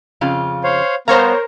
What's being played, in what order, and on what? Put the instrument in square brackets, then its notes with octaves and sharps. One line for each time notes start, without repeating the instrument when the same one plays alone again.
[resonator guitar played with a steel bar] F2 C#3 F4
[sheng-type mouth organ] C5 C#5 F5
[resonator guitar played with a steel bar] G3 F5 [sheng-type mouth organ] B3 [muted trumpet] A#4 [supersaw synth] C5 C#5 A#5